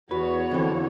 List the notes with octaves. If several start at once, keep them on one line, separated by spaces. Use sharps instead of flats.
E2 B3 F#4 B4 C#5
F2 D3 E3